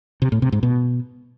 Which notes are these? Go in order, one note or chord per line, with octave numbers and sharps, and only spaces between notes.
C3
A2
C3
G#2
B2